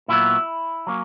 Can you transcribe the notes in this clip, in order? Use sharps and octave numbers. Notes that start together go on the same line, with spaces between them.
A#2 F#3 B3 E4
F#3 A#3 C#4